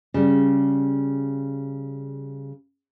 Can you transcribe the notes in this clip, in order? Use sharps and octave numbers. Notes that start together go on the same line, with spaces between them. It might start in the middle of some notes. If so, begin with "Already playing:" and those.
C#3 G3